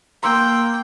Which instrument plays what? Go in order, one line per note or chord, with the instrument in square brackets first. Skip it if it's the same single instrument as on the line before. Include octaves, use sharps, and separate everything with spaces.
[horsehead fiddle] A#3 [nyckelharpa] G5 [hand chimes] A#5 C6 E6